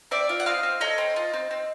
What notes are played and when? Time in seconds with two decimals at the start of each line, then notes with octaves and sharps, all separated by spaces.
0.11 C4 D5 E5
0.29 F4
0.40 F#5
0.46 C4 D#5 F5
0.63 C4
0.81 A4 C#5 D#5
0.98 C4
1.16 F4
1.34 C4
1.51 C4